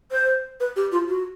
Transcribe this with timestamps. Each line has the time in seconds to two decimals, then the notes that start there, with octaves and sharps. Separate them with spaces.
0.11 C5
0.60 B4
0.76 G4
0.92 F4
1.08 F#4